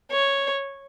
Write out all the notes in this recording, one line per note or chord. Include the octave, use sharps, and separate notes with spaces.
C#5